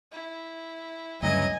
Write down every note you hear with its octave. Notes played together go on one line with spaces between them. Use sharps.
E4
D2 G2 C#3 E3 F#3 D#5 G#5